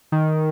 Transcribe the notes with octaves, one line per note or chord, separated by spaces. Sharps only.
D#3